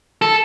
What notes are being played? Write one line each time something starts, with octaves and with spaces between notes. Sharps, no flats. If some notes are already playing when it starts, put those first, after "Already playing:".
A4